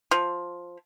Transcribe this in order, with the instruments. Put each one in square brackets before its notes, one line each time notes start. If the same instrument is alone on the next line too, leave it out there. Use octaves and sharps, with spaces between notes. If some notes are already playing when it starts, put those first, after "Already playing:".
[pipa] F3